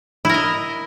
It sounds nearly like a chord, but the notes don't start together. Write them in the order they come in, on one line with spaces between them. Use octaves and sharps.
E4 A#4 D#5